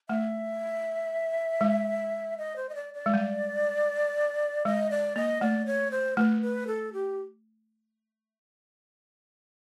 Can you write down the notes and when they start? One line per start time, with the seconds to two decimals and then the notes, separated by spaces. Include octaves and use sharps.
0.09 A3 E5
1.61 G#3
2.38 D#5
2.56 C5
2.69 D#5
2.75 D5
2.94 D5
3.06 G#3
3.14 G3
4.65 G#3 D#5
4.91 D5
5.16 A#3 D#5
5.41 A3 D5
5.66 C#5
5.91 C5
6.17 A3 B4
6.42 B4
6.67 A4
6.93 G4